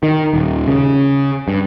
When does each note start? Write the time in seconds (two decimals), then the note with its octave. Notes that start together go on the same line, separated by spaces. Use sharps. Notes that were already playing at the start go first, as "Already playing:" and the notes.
0.03 D#3
0.33 D#1
0.68 C#3
1.48 G2